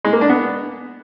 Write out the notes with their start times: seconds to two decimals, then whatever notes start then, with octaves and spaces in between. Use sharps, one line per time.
0.04 G#3
0.13 A#3
0.21 D4
0.29 B3